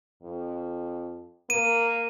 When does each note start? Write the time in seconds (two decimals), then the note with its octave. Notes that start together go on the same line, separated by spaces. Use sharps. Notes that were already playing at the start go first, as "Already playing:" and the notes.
0.23 F2
1.50 A#3 D#7